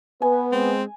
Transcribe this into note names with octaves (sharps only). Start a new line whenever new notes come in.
B3 B4 G#5
G#3 C4